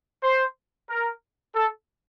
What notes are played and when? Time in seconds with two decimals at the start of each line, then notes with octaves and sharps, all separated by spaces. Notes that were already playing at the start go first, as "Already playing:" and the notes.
0.23 C5
0.89 A#4
1.55 A4